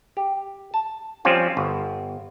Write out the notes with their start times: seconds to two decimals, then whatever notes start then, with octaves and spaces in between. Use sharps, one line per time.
0.17 G4
0.74 A5
1.25 F3 G3 C4 C#4 F4
1.57 G1